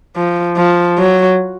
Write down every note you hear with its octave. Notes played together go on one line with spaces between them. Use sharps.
F3
F3
F#3